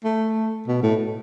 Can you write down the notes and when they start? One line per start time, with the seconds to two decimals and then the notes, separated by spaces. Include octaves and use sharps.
0.05 A3
0.68 B2
0.83 A2